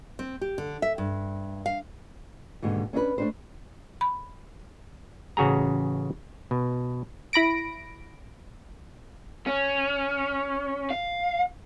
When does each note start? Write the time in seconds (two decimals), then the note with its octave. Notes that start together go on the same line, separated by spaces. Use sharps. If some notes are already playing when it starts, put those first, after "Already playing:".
0.19 C4
0.41 G4
0.58 D3
0.82 E5
0.98 G2
1.66 F5
2.62 D#2 G#2 B2 D3
2.93 C#4 D4 E4 B4
3.18 A3 D4 C5
4.01 B5
5.37 A1 C#3 F#4 G#4 A#5
6.51 B2
7.33 E4 B5 A#6 D7
9.47 C#4
10.90 F5